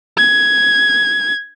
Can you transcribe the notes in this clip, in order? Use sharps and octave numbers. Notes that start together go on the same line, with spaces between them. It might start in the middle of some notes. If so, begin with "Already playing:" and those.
G#6